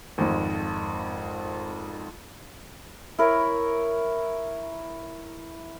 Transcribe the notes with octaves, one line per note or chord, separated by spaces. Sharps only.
G#1 F2
E4 A#4 C#5